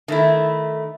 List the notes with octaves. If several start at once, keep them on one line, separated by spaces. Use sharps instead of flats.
D#3 A3 E4